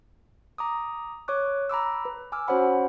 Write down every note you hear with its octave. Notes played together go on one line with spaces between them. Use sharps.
A#5 D6 D#6
C#5 C#6 D6 F#6
A#5 B5 D6 E6
B4
G#5 D6 E6 F6
C#4 F#4 C5 C#5 F#5 B5